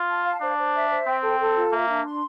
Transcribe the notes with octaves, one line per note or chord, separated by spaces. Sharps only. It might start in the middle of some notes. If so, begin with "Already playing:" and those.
Already playing: F4
A5
F5
D4 C5
C5
E5
C5
C4 G5
A4
A4
F4
A#3 E5
D4
C6